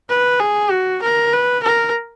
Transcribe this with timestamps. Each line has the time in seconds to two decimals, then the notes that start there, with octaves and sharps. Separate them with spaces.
0.10 B4
0.40 G#4
0.71 F#4
1.03 A#4
1.33 B4
1.63 A#4